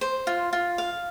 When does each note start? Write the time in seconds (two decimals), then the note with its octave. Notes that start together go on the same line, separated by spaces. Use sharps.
0.01 C5
0.27 F4
0.53 F4
0.78 F5